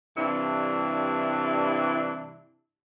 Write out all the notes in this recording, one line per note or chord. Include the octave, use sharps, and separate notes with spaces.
G2 C3 E3 D4 E4